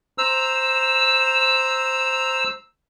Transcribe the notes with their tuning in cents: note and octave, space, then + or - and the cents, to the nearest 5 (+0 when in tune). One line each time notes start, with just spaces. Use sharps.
C5 +0 A#5 +0 E6 +0